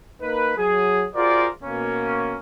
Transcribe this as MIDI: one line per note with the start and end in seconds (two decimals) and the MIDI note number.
0.21 0.55 58
0.21 0.55 63
0.21 0.55 70
0.21 0.55 71
0.58 1.06 54
0.58 1.06 68
1.15 1.48 65
1.15 1.48 66
1.15 1.48 68
1.15 1.48 70
1.15 1.48 72
1.15 1.48 74
1.64 2.38 47
1.64 2.38 58
1.64 2.38 61